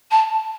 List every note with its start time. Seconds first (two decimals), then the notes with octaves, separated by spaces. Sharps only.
0.11 A5